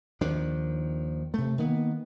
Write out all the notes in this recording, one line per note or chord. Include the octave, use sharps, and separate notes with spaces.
D#2 D#3 F3 D4
C3 A3
D#3 A#3 B3